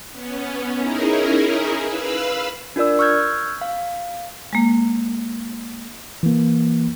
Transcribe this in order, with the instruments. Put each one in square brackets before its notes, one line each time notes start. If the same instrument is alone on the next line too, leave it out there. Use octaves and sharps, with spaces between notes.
[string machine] B3 C#4
C#4 D#4 E4 G#4 A#4
B4 F5 B5 E6
[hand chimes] D4 F4 A#4 D5 E6
C#6 E6 F6 G6 G#6
F5
[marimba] G#3 A#3
[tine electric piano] E3 A#3